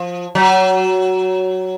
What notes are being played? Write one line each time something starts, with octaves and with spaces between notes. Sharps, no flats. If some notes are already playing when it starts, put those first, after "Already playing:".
Already playing: F3
F#3